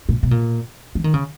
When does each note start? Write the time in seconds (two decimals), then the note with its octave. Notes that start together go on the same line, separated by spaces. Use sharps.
0.09 A#2
0.23 B2
0.31 A#2
0.95 E3
1.04 D#3
1.14 C#3